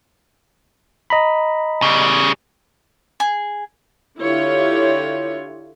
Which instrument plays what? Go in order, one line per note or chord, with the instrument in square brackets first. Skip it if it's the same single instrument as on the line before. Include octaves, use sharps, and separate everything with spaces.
[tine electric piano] D#5 A#5 B5
[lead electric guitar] C#3 G3
[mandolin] G#4
[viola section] D3 E4 F4 G4 C#5